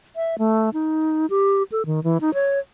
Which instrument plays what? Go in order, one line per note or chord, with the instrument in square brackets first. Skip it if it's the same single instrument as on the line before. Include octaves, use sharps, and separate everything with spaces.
[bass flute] E5
A3
D#4
G4
A4
D#3
E3
D#4
C#5